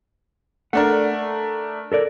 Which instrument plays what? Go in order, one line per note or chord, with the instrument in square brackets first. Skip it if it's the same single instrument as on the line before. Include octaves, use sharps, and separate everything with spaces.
[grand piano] A3 D4 A#4 [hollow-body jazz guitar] D5 F#5
[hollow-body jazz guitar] A4 A#4 D5